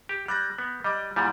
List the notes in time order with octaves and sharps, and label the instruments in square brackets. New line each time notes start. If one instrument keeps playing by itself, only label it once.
[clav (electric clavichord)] G4
[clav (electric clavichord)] G3 [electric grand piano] F#6 G6 A#6
[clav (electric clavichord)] B3
[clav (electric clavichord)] G3 [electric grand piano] D#5 D6
[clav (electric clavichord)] A#2 G3 [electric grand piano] E4 F#5 G#5